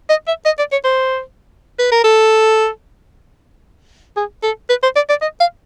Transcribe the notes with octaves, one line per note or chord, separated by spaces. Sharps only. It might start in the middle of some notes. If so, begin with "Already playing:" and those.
D#5
E5
D#5
D5
C#5
C5
B4
A#4
A4
G#4
A4
B4
C5
D5
D5
D#5
F5